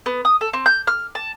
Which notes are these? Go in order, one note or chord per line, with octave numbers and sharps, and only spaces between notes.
B3
D#6
A4
C4
G6
F6
A5